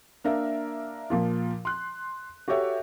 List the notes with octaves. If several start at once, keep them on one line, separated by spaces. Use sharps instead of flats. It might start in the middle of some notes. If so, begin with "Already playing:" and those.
A#3 D4 A#4 E5 F5
A#2 F3 F4
C6 F#6
F#4 G4 A4 C#5 E5